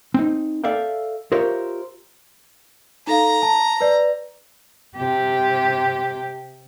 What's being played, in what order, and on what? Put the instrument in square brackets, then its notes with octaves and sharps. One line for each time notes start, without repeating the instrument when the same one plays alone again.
[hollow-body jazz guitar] C4 D#4
A4 D5 E5 F5 G5
F4 G4 A#4 C5 C#5 E5
[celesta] D#4 A4 F5 [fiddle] A#5
[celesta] A5
B4 D5
[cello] C3 G4